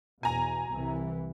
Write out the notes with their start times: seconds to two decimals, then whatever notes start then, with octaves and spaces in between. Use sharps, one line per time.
0.23 E2 B2 G#5 A#5
0.71 C2 E3